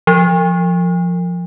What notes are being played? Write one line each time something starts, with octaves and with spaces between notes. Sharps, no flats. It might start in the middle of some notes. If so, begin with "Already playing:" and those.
F3